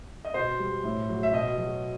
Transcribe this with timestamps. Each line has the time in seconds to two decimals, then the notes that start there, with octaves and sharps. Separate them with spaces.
0.25 D#5
0.34 B2 C5
0.59 G3
0.84 A2
1.09 F#3
1.23 E5
1.33 B2 D#5
1.57 F#3